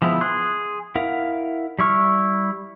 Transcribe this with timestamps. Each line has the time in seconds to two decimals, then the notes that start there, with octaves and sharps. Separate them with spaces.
0.02 F3 G#3 B3 E4
0.21 G#4 C6 F#6
0.95 E4 A#4 F5 F#5
1.79 G3 E4 C#6 F6